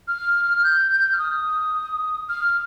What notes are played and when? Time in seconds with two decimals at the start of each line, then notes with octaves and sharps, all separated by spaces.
0.08 F6
0.57 F6
0.63 G6
0.91 G6
1.12 F6
1.19 D#6
2.29 F6